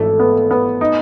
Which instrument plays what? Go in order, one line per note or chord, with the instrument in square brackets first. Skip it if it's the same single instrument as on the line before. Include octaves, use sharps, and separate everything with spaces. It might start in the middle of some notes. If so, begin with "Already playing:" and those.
Already playing: [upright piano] G#1 E3 [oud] A3
[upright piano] B3
B3
D#4